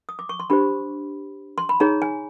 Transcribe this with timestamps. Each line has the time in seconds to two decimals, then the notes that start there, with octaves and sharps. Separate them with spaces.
0.09 D#6
0.19 D6
0.29 C#6
0.40 C6
0.50 D4 G4 C5 B5
1.58 C6
1.69 B5
1.80 D#4 G#4 C#5 A#5
2.02 G#5